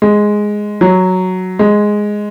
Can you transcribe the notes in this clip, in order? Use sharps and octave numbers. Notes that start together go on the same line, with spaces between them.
G#3
F#3
G#3